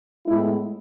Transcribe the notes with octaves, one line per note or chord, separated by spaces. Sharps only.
A2 G#3 B3 E4